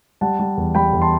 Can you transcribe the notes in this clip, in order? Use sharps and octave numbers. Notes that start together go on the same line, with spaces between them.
G3 F#5 A5
G3
E2
G3 G5 B5
E2
A5 C6